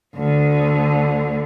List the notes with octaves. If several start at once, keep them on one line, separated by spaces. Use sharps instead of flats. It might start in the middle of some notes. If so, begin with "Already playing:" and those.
D2 D3